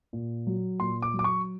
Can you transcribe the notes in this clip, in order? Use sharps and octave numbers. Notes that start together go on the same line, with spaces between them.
A#2
F#3
A#2 C6
D6
F#3
D6
C#6